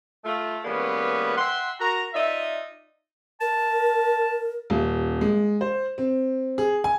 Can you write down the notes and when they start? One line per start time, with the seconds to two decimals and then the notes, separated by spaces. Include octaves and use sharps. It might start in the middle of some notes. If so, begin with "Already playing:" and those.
0.24 A3 F4
0.64 E3 G3 G#3 A#3 B3 C#4
1.37 E5 F#5 G5 C6
1.79 F#4 A#4 A#5
2.13 D#4 F4 D5 E5
3.41 A#4 A5
4.70 D#1
5.21 G#3
5.61 C5
5.98 C4
6.58 G#4
6.84 G#5